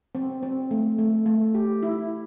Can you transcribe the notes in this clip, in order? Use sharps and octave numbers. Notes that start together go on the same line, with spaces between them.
C4
C4
A3
A3
A3
G4
E4